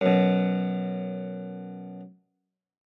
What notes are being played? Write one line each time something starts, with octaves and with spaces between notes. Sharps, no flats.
F#2 B2